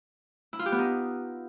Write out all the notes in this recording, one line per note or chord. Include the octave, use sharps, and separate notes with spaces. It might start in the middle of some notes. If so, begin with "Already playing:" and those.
E4
F4
G4
B3
D#4